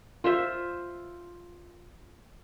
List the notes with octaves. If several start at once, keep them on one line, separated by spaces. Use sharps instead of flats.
F4 C5 E5